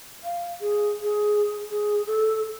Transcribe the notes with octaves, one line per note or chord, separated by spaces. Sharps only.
F5
G#4
G#4
G#4
A4